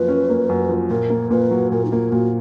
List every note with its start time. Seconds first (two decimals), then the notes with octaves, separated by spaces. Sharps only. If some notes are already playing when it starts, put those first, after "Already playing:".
Already playing: F#2 F3 A#3 B4
0.08 C#4
0.29 A#3
0.49 F#2
0.69 F3
0.90 A#2 A#4
1.10 A#3
1.30 A#2 B4
1.51 F#3
1.72 A#2 A#4
1.85 D#4
1.92 A#3 F4
2.12 A#2 F#4